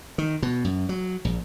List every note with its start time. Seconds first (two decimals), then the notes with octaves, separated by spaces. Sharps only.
0.18 D#3
0.42 B2
0.64 F#2
0.89 F#3
1.25 A#1